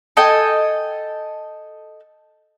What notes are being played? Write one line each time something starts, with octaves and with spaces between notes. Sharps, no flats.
A4 D#5 G5 G#5